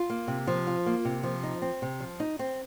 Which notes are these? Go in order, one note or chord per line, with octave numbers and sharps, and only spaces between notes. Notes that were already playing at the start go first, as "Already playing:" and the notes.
Already playing: F4
A#3
C3
F3
F4
A#3
C3
F3
D#4
C4
C3
F3
D#4
C4